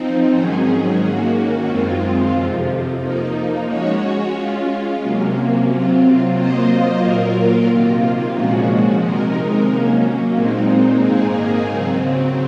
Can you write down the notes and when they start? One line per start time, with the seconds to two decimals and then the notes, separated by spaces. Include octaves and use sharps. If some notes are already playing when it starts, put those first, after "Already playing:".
Already playing: F3 C4 D#4
0.31 G#2 D#3 F#3 C#4 G#4
0.98 D#3 A#3 C#4 F#4
1.66 F#2 D#3 G#3 C4 F4
2.32 F2 C3 F3
2.99 F3 A#3 D#4
3.66 G#3 C#4 F#4 C#5
4.33 G#3 C#4 F4
4.99 C3 F#3 A#3 C#4
5.67 C3 F#3 C4 F4
6.33 F#3 A#3 F4 C5 D#5
7.00 A#2 F#3 A#3 F4 A#4
7.66 C3 D#3 A#3 F4
8.34 A#2 F3 G#3 C#4 F#4
9.00 C3 D#3 G#3 D#4 A#4
9.66 F#3 A#3 C#4
10.33 A#2 G#3 C4 D#4
11.01 G#2 D#3 A#3 D#4 G#4
11.68 C#3 F#3 C4